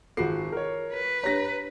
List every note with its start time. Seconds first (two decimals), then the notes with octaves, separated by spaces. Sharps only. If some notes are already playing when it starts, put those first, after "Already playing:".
0.17 G#1 F4 F#4 G#4 A4 C7
0.52 A#4 C#5
0.94 B4
1.24 D4 G4 C#5 A#5 A#6